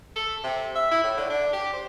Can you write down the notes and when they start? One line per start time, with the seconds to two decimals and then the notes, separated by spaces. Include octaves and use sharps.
0.16 A4
0.44 C3
0.75 E5
0.91 E4
1.04 A2
1.17 D3
1.30 D4
1.53 G4
1.73 C5